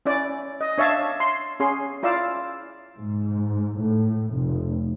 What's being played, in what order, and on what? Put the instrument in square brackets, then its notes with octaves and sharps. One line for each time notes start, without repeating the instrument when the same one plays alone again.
[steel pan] C#4 E4 D5
D#5
D4 C#5 E5 F5 A5
C6
C#4 G#4 C6
E4 F4 D5 F5 E6
[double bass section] G#2
A2
F1